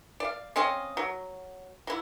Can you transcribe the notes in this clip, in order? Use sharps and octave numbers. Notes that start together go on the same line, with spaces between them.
D5 F5
C4 C#4 D#5 F5
F#3
F#3 E4